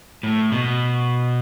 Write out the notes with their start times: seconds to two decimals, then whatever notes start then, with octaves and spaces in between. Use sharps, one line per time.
0.23 A2
0.52 B2